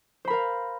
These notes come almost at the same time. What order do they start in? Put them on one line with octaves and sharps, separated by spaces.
C5 B5 A#4 F5